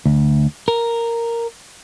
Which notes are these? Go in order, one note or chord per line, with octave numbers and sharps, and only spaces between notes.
D2
A#4